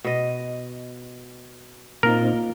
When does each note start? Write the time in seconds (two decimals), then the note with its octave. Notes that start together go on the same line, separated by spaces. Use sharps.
0.04 B2 D#5
2.03 A#2 A#3 C4 D#4 F4 A#4